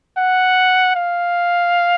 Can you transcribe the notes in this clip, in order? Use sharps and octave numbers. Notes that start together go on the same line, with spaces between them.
F#5
F5